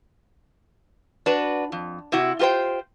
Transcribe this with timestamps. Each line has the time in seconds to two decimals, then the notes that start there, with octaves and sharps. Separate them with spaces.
1.26 D4 F#4 B4
1.72 F2
2.12 C3 E4 F#4
2.39 F4 G4 A#4 C5 G5